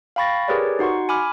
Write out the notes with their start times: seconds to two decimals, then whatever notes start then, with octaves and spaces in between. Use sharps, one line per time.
0.16 F5 G5 B5 C#6 A6 A#6
0.48 G4 G#4 A#4 B4 C#5 D5
0.79 D#4 F#4 F#5 C6 C#6
1.09 G#5 B5 D6 F6